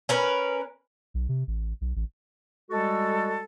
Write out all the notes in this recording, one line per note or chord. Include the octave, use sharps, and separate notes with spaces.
C#4 A#4 B4
B1
C3
A1
B1
A1
G3 G#3 F#4 A4